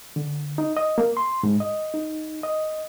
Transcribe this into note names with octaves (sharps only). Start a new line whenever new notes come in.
D3
D#4
D#5
A#3
C6
G#2
D#5
D#4
D#5